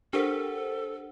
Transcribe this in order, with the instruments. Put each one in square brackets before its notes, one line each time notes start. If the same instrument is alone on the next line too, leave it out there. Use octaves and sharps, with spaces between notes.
[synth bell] D4 C5 F#5 [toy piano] G4 A#4 [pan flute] A4